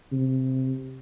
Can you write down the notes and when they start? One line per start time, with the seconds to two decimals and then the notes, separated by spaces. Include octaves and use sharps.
0.12 C3